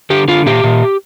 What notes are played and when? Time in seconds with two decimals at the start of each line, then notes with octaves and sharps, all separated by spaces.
0.10 D3 G4
0.28 D3 F4
0.46 A#2 G4
0.64 A#2